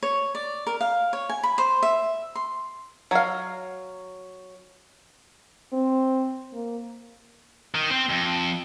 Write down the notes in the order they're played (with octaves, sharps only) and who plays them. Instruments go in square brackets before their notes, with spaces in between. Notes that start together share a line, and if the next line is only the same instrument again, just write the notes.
[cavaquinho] C#5
D5
A#4
F5
C#5
G#5
B5
C5
E5
C6
[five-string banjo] F#3 F5
[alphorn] C4
A#3
[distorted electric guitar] D#3
C4
F2